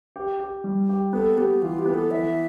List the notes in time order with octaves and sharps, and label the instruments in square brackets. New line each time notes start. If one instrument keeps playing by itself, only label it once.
[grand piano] G4
G4
G3
G4
[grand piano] B3 [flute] A4
[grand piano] B3 [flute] G4
[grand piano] E3 [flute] F4
[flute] G4
[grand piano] B3
[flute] A4
[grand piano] E3 [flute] E5